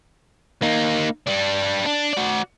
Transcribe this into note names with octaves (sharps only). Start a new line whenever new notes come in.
A#3 D#4
G3 D4
D4
F#4 D5